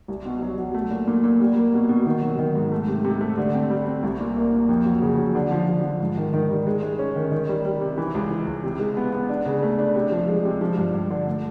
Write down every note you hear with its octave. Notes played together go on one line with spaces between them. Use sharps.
C2
B2
F#3
F#3
A3
A#2
A#2
A#2
G3
A#3
B2
B2
D#3
F#3
D#3
G#2
A3
C3
C3
A3
D3
C4
G3
C4
C2
A#2
A#3
A#2
F2
F#3
C#3
F#3
D3
F3
D3
F3
G#2
D#3
D#3
G3
G#3
G#3
C#4
D#3
D#3
G3
G3
C3
E3
C#2
E3
C#2
C3
G#3
B3
B3
D4
C#3
A3
D4
C3
F3
G#3
C3
F3
G2
G2
D3
A3